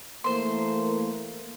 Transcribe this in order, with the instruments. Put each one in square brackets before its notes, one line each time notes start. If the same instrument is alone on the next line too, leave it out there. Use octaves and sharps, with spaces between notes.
[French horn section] E3 A3 A#3 [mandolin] C5 C6